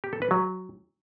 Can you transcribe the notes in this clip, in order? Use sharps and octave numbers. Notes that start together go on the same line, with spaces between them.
G4
A4
B4
F#3